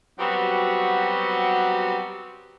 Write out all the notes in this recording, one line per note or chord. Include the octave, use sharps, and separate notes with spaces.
F#3 G3 B3 C4 F#4 G4